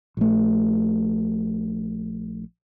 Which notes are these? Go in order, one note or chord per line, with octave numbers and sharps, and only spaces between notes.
A#1 A3